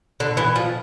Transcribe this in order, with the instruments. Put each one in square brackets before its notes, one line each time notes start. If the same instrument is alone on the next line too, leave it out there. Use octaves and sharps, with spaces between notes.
[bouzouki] D3
E3
F3